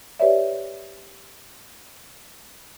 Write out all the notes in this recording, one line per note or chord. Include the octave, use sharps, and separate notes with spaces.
G4 B4 C#5 D5 E5